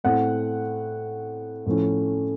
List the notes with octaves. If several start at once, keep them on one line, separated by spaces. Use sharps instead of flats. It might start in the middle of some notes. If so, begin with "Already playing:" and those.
A2 A3 C4 F#5
A2 F3 A3 C#4